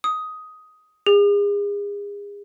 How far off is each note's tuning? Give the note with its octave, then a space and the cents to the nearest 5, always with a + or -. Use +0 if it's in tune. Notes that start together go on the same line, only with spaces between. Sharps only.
D#6 +10
G#4 -35